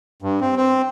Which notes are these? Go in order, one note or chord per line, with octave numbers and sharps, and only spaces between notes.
G2
C4
C4